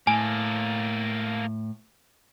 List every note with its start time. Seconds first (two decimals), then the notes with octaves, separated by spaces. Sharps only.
0.07 A2 A#3 A4 G#5